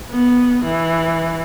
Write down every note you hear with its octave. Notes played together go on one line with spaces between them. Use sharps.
B3
E3